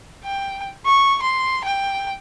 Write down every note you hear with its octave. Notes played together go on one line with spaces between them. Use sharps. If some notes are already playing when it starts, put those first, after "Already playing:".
G5
C#6
C6
G5